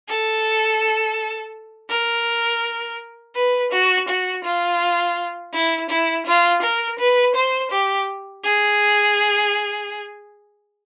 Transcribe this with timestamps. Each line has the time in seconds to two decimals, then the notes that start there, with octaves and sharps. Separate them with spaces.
0.08 A4
1.90 A#4
3.35 B4
3.72 F#4
4.08 F#4
4.45 F4
5.53 E4
5.90 E4
6.26 F4
6.62 A#4
6.99 B4
7.35 C5
7.71 G4
8.44 G#4